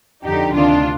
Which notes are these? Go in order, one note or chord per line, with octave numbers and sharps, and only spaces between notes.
F2 D3 D#4 G4
D2 C3 D#3 D4 F4